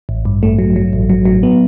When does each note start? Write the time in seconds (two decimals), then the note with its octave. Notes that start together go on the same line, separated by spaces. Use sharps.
0.09 A1
0.25 G2
0.43 A3
0.59 F#3
0.76 F#3
0.93 A1
1.10 F#3
1.25 F#3
1.43 B3